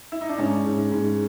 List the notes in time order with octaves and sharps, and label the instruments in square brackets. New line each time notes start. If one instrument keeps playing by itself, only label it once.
[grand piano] E4
D#4
D4
[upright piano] G#2 [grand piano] C#4
[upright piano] G#2
G#2